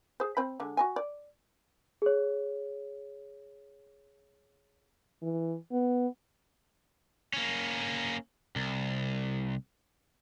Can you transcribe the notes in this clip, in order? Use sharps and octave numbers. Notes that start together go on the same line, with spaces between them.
G#4 C5
C4 C5 B5
D3 G#3
F#4 D#5 G#5
D5
G#4 C#5
E3
B3
A#3 C#4
C2